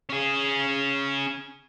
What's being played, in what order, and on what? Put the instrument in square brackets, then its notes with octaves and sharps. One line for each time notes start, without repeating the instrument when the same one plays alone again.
[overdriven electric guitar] C#4 G#4